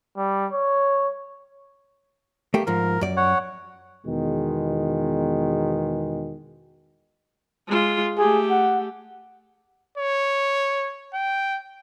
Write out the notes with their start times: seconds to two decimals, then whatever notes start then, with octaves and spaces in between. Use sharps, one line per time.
0.17 G3
0.52 C#5
2.54 A3 A#3 G4
2.67 G#2 F3 A#4
3.01 F#2 D5
3.17 C#5 F#5
4.06 E2 B2 D#3 G#3
7.67 G#3 F4
8.18 A3 G4 G#4
8.50 F#5
9.98 C#5
11.14 G5